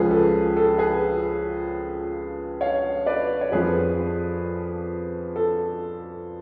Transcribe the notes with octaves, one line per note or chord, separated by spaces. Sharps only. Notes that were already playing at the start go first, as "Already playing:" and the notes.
Already playing: C#2 C#3 F3 G#4 B4
A4
A4
G#4 B4
C#5 F5
B4 D5
C#5
F2 F3 G#4 B4
A4